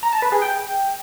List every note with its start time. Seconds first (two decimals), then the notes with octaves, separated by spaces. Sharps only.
0.03 A#5
0.13 A5
0.22 B4
0.32 G#4
0.42 G5